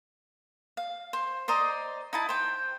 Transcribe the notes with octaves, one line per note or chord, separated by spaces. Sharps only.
F5
C5
C5 D5 D#5 A#5
D#4 E4 A5
C5 G5